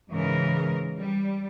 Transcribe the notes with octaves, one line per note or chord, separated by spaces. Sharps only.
G#2 C#3 E3 A#4
G3